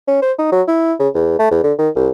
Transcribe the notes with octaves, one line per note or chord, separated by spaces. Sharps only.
C#4
C5
D#4
F#3
E4
C#3
E2
A3
E2
D3
D#3
C2